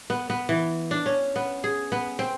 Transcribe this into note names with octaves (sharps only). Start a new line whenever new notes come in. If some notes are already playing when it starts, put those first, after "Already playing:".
B3
B3
E3
D4
C#4
B3
G#4
B3
C4